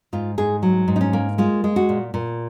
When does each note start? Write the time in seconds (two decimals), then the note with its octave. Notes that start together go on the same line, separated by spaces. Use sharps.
0.13 G#2 F4
0.38 G#2 G#4
0.63 F#3
0.88 G#2
0.96 D#4
1.01 C#4
1.13 A#3
1.38 G#3 F4
1.64 G#3
1.76 F#4
1.89 A#2
2.14 A#2